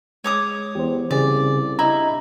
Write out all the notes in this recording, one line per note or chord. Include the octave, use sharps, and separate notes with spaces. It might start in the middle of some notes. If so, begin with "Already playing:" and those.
G#3 C#5 D6 D#6
E2 G4 C5
C2 C#3 G#4 D5
D4 E4 D#5 A#5